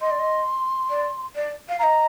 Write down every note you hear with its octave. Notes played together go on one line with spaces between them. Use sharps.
D#5 C6
D5
D#5
D5
D5
F5
D#5 F5 A#5